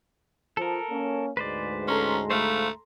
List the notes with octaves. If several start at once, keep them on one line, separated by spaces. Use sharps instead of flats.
F3 A4 A#4
A#3 C#4
D2 G#2 G#3 B4 C5 D5
C#4 A4 A#5 C6
A3 C5 F5 B5